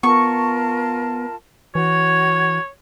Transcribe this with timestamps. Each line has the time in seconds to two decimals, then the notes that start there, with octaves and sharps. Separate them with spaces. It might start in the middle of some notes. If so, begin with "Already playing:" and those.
0.03 B3 F4 A#4 A5 C#6
1.75 E3 F#4 C#5 G#6